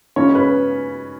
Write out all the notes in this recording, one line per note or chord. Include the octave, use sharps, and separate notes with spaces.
C#3 G#3 C#4 C#5
B4